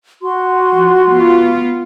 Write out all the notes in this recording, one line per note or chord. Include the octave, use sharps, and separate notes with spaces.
F#4 C6
F3
B3 F4